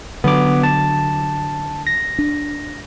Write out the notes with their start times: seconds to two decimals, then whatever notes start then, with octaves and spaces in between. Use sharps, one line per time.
0.24 D3 F#3 B3 D6
0.63 A5
1.87 A#6
2.19 D4